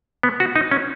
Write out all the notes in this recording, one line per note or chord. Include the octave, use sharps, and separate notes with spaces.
B3
F#4
D#4
C#4